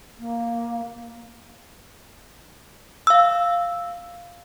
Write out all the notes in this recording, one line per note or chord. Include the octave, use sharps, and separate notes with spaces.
A#3
F5 E6